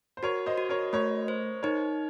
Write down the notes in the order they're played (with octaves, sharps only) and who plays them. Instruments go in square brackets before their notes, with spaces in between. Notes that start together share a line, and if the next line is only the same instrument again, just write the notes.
[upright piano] C5
[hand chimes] F#4 [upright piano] A#4 C#5
[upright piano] C5 D#5
[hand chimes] F#4
[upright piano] A#4 C#5
[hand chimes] A3 [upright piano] A#4 C#5
[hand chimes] C5
[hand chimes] D#4 [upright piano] A#4 C#5